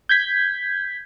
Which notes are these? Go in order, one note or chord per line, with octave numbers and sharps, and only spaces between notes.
G6 G#6 B6